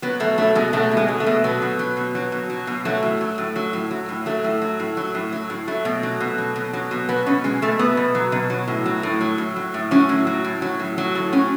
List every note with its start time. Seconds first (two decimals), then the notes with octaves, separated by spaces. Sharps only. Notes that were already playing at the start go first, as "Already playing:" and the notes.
0.02 F#3 B3
0.20 B2 A3
0.38 F#3 A3
0.55 B2 G#3
0.73 F#3 A3
0.91 B2
0.97 G#3
1.08 F#3
1.20 A3
1.26 B2
1.44 F#3 B3
1.62 B2
1.79 F#3
1.97 B2
2.15 F#3
2.32 B2
2.50 F#3
2.67 B2
2.85 F#3 A3
3.03 A2
3.21 F#3
3.38 A2
3.56 F#3
3.73 A2
3.91 F#3
4.09 A2
4.26 F#3 A3
4.44 A2
4.61 F#3
4.80 A2
4.97 F#3
5.15 A2
5.33 F#3
5.50 A2
5.67 F#3 A3
5.85 B2
6.03 F#3
6.21 B2
6.38 F#3
6.56 B2
6.73 F#3
6.91 B2
7.09 F#3 B3
7.26 B2 C#4
7.44 F#3 G#3
7.62 B2 A3
7.79 F#3 B3
7.97 B2
8.15 F#3
8.32 B2
8.50 F#3
8.68 A2
8.86 F#3
9.03 A2
9.21 F#3
9.38 A2
9.56 F#3
9.74 A2
9.91 F#3 C#4
10.09 A2
10.27 F#3
10.44 A2
10.62 F#3
10.80 A2
10.98 F#3
11.15 A2
11.33 F#3 C#4